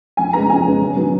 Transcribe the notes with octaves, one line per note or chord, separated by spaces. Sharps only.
F2 G#5
C#3 G#3 B3 A#5
F2 G#5
C#3 G#3 B3
F#2
D#3 F#3 B3